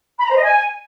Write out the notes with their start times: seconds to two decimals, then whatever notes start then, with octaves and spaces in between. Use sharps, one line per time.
0.17 B5
0.24 A#5
0.30 C5
0.36 D#5
0.42 G#5